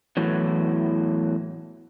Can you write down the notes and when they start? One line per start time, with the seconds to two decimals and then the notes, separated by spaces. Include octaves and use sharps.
0.17 E2 A2 E3 F#3